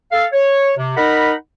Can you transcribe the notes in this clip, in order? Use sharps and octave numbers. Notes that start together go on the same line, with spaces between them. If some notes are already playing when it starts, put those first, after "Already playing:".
A4 F5
C#5
C3
D#4 A#4 D#5 F#5 B5